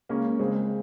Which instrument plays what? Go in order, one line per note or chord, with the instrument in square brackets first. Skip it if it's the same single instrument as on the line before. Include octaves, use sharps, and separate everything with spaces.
[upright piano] C#2 C#3 A#3 C#4
C#2 C#3 G#3 C4